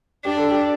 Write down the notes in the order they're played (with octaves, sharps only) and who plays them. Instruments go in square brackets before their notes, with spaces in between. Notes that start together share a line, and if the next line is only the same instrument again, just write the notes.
[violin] D4 [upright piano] G4
[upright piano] A4
G4